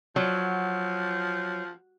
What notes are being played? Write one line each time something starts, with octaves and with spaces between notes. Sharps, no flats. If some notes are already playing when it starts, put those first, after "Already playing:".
F3 F#3